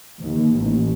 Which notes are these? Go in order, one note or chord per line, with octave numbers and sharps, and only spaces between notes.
D#2
A1